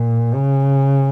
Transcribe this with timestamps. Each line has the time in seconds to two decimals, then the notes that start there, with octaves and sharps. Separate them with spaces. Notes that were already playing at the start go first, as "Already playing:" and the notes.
Already playing: A#2
0.35 C#3